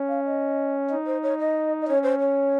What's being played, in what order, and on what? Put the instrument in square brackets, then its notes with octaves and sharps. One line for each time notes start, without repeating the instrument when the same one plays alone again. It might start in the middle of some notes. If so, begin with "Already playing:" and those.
Already playing: [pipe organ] C#4
[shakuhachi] F5
D#5
[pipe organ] D#4
[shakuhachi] C5
C#5
D#5
D#5
[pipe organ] C#4 [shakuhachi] C#5
[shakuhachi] C5
C#5